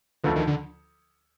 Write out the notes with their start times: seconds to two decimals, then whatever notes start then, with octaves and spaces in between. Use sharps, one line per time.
0.24 D2 D3 D#3 F3
0.36 D#3
0.47 D3